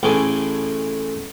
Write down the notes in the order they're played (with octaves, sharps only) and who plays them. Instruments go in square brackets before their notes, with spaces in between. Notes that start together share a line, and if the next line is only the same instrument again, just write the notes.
[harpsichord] A1 A2 A3 G#4 D6